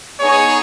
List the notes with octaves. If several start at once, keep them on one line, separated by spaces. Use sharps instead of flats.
B3 D#4 G#4 C#5